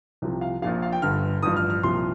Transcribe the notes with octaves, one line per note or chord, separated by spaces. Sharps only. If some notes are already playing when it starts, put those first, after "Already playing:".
C2 C3 F3
F5
A#1 A#2 F3 F5
F5
G5
G1 G2 D3 F6
A1 G2 F3 D#6
F6
F6
C2 A#2 F3 C6